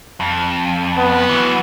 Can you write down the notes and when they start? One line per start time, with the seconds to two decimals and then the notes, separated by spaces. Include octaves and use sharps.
0.20 F2
0.97 B3
1.29 E3 F#3